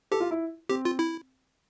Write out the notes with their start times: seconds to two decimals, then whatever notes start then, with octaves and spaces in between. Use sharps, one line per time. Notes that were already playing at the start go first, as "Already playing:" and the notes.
0.11 G4 A4
0.20 F4
0.31 E4
0.69 C4 G4
0.85 F4
0.99 E4